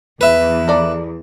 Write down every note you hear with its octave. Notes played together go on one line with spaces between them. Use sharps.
E2 B4 E5
A4 D5 A#5